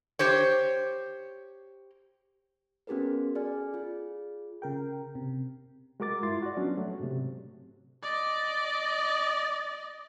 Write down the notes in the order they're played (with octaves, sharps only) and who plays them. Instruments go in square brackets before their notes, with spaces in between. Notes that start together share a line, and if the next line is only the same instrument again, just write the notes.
[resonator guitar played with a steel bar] G4 C5 C#5
[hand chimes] B3 C#4 F#4 G#4 A#4 B4
G#4 A4 D5 G#5 F6
F4 G#4
[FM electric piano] C#3 A#4 G5
C3
[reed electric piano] G#3 F#4 A#4 D6 A6
G2 E4 F4 C6 A6
F#4 D5
F#3 B3 C#4 D4
F#3 A3
G#2 C3
[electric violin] D5 D#5